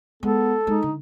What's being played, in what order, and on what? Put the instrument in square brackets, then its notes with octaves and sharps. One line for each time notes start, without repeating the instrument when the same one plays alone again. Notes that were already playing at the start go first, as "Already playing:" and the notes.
[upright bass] G#3 [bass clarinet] B3 [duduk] A4
[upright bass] G#3 [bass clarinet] D#4
[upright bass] D3